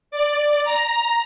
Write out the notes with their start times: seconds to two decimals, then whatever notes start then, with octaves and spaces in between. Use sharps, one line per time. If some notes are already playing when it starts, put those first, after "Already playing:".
0.11 D5
0.64 A#5